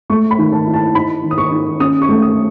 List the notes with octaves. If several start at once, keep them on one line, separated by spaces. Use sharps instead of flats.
A3 C#6
B5
D#3
A5
E4
A5
D#4 B5
D#3
D#6
C#6
D#3
C#4 D#6
C#6
A3
D#6